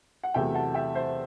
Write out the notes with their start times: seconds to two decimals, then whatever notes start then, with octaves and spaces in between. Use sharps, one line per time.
0.23 F#5
0.34 E2 C3 F#3 A3 E5 G5
0.54 F#5 A5
0.75 E5 G5
0.95 C5 E5